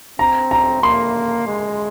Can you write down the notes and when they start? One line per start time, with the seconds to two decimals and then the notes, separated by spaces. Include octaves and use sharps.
0.19 C4 A#5
0.51 A#5
0.83 A#3 C6
1.47 G#3